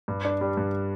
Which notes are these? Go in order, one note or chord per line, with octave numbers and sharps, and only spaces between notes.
G2
D4
G3
G2